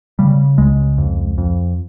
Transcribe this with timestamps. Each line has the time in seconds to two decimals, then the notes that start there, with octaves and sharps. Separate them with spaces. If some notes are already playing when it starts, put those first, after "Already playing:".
0.19 C#3 G3
0.58 C#2 G#3
0.98 F2
1.38 F2